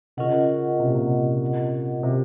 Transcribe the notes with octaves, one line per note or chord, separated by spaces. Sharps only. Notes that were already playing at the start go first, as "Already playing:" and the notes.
C#3 C#4 F4 A#4 D#5 F#5
C3
A#2
C3
C3